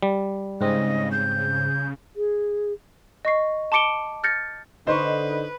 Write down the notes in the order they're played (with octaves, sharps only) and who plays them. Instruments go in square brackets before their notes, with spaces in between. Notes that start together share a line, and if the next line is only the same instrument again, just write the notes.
[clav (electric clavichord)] G3
[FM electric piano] G#2 C4 [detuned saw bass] C#3 [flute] D#5
[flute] G6
[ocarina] G#4
[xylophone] D#5 C#6 C7
A5 C6 D6 C#7 D7 G7
F6 G6 A6 A#6 C#7
[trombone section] D3 [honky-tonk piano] D#4 [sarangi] B4 [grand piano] C5 C6 C#6